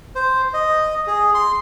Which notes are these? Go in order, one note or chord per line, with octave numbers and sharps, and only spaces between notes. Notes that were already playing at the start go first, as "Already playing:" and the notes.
C5
D#5
G#4
C6